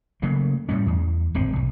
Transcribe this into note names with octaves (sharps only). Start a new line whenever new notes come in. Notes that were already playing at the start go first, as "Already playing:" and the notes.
C#3 F#3 A3 A#3
A2 G3 C#4
E2
D1 G#1 D3 C4
B1